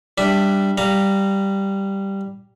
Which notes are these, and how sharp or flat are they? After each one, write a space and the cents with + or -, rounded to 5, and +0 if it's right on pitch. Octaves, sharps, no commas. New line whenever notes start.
G3 +0 D4 +0 E5 +0
G3 +0 F5 -5 A#5 -15